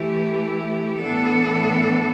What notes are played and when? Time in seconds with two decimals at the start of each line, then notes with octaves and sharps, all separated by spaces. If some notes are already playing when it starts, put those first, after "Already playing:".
Already playing: E3 A3 E4 G4
1.00 A2 E3 B3 D4 A4